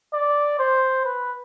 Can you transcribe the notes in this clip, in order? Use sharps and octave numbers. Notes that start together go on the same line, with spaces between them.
D5
C5
B4